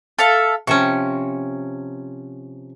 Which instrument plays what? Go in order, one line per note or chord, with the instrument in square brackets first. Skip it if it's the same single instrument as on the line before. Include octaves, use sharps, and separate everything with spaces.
[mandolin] A4 E5 F5
[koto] C3 F3 C#4 [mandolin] C#6